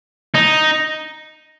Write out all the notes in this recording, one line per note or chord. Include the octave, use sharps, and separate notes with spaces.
D#4